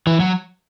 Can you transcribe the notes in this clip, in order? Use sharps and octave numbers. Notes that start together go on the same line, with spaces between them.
E3
F#3